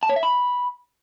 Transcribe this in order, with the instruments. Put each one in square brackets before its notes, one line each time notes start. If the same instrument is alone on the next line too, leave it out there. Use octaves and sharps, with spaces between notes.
[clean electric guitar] A5
C#5
E5
B5